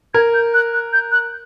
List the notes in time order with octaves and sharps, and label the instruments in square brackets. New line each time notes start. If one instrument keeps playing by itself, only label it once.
[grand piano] A#4 [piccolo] G#6
[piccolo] G6
F#6
F#6
G6
F#6